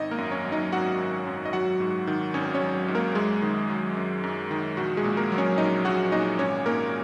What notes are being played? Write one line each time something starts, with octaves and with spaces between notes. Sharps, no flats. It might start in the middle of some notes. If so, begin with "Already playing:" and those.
Already playing: G#1 D#4 D#5
A#3 A#4
F#2
C#4 C#5
F#3
D#4 D#5
G#1 F#4 F#5
G#1
F#2
D#5
F#3 F#4 F#5
G#2
D#3
G#1 C#4 C#5
C#4 C#5
F#3
G#2
A#3 A#4
F#2 G#3 G#4
D#3
F#3
F#2
F#2
D#3
A#1 F#4
G#3 G#4
A#2
A#3 A#4
F#3
C#4 C#5
A#1 D#4 D#5
A#1 F#4 F#5
A#2 D#4 D#5
G#1 C#4 C#5
G#2 A#3 A#4